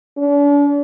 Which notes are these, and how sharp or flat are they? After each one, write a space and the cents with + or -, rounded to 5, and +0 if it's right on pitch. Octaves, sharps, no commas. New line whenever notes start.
D4 -40